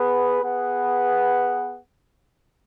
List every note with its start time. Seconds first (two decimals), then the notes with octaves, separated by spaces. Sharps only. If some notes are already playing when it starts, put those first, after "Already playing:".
Already playing: B3 G#4 B4 F#5
0.42 B3 G#4 B4 F#5